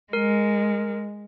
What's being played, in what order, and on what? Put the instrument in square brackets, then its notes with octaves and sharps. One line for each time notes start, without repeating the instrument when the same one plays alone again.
[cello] G#3 [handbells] A#4